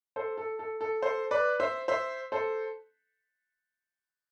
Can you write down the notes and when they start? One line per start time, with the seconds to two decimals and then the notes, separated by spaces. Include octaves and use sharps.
0.16 A4 C5
0.38 A4
0.59 A4
0.81 A4
1.02 A4 C5
1.31 B4 D5
1.60 C5 E5
1.88 C5 E5
2.32 A4 C5